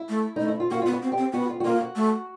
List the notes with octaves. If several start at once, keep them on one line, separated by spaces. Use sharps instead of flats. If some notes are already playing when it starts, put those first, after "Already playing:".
Already playing: E4
A3
A3 D#4
E4
F4
A#3 F#4
B3 F4
F#4
C4
G4
C4
B3 F#4
F4
F#4
A#3 F4
F#4
A3